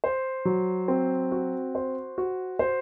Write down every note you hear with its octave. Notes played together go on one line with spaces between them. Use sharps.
C5
F#3
C4
F#4
C5
F#4
C5